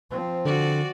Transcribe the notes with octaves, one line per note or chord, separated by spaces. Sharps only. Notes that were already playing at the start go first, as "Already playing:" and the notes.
F3 C4
D3 F#4 D5